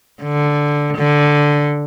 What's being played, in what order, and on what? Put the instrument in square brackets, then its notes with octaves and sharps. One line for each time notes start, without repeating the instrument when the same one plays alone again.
[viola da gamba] D3
D3